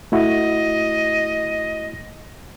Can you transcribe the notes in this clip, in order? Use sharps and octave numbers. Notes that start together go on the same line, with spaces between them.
A3 E4 F#4 D#5